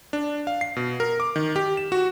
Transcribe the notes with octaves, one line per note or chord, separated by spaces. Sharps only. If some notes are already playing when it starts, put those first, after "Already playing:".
D4
F5
C7
B2
A#4
D6
D#3
G4
E7
F#4